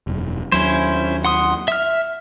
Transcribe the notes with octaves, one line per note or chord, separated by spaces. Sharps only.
E1 F#2
D#2 F#3 C#4 E4 C5
F#5 C6 D#6
E5 F6